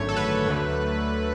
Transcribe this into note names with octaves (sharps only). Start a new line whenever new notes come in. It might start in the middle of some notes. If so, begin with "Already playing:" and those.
Already playing: G#1 F#2 D3 A3 C#5
A4
B4
D2 D3 F#3 A3